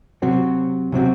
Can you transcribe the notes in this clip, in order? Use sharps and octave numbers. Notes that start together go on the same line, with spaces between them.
C3 F#3 C4 F#4
C3 F#3 C4 F#4